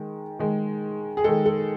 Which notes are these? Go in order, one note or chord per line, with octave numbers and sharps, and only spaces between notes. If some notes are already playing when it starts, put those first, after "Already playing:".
Already playing: D#3 G#3
D#3 G#3
G#4
D#3 G#3 A4
A4